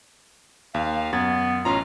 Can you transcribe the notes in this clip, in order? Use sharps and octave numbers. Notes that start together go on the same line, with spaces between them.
D#2 F5
F#2 B3 G#6 A6
A1 C#4 F4 A#5